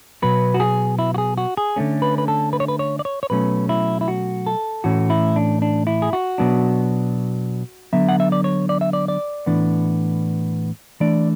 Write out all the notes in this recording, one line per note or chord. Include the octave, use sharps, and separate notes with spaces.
B2 F#3 B3 B4
F#4
G#4
E4
F#4
G#4
F#4
G#4
D3 A3 C#4
B4
B4
A4
B4
C#5
B4
C#5
D5
C#5
C#5
B2 F#3 A3 C#4 B4
E4
E4
F#4
A4
A2 E3 A3 C#4 F#4
E4
D4
D4
E4
G#4
F#4
B2 F#3 B3 D4
D3 F#3 B3 E5
F#5
E5
D5
C#5
D5
E5
D5
D5
A2 E3 B3 D4
E3 A3 D4 D5